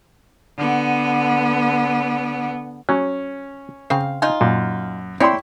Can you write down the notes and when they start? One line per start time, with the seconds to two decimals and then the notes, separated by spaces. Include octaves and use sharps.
0.58 D3 B3
2.89 F#3 C#4
3.90 C#3 C4 C5 F5
4.22 D#4 F4 G#5
4.41 F#2 A#2
5.20 C4 E4 C#5 D5 G5 C6